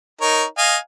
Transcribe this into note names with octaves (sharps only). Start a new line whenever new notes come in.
D#4 A#4 C#5
D#5 F5 G#5